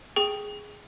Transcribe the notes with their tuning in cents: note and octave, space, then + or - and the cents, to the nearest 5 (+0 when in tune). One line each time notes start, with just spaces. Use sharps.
G#4 +0 G5 +0 C#6 +20